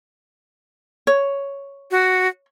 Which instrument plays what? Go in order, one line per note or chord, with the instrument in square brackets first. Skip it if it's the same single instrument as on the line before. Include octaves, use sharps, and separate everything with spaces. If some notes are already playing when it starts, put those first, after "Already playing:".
[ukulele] C#5
[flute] F#4